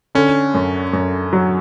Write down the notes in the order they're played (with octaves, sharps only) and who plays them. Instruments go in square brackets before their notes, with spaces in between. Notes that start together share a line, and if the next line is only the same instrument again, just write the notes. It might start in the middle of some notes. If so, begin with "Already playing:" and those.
[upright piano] D3 [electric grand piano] C#4
[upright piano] F#2
F#2
F#3